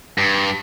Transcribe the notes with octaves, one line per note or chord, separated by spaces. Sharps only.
G2